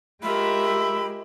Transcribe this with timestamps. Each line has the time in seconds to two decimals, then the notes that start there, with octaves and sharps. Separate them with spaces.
0.23 G#3 F4 G4 A#4 E5 B5